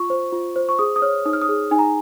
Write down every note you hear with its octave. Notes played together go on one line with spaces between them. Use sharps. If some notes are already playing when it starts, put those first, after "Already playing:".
Already playing: F4 C#6
C5
F4
C5
C#6
G#4 D#6
D#6
C#5 F6
D#4 D#6
F6
D#6
G#4
D#4 G#5
A#5